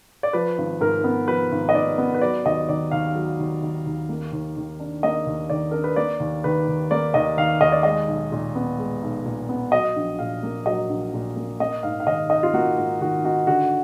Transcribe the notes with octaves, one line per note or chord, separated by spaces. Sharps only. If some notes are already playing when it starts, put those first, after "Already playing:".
D5
F3 B4
G#1
G#2 A#4
B3
F3 B4
G#1
D#5
G#2 D5
B3
B4
F#3 D5
D#2 D#5
D#3 D5
D#2 F5
F#3
D#2
D#3
D#2
A#3
D#2
D#3
D4
A#3 D#5
D#2
D#3 D5
D4 A#4
B4
A#3 D5
D#2
D#3 B4
D#2
A#3 D5
D#2 D#5
D#3 F5
D#2 D#5
D5
G#3 D#5
B1
A#2
B3
G#3
B1
A#2
B3
F#3 D#5
A#1
A#2 F5
A#3
F#3 D#5
A#1
A#2
A#3
A#3 D#5
G#2 F5
F5
D#3 D#5
D#4 D#5
F4
A#3 F#4
G#2
D#3 F#4
D#4 F#4
D3 F#4